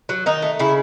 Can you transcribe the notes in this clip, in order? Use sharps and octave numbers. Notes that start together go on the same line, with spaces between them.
F#3
D#3 D#4
A3
C#3 E4